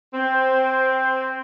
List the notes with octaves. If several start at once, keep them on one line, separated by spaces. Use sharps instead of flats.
C4